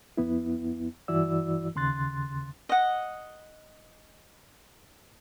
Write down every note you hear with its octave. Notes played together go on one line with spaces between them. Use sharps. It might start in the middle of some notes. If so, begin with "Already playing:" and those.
F2 B3 E4
G2 E3 E4 F#4 D5 E6
D#2 C#3 C6 F#6 A6
D#5 F#5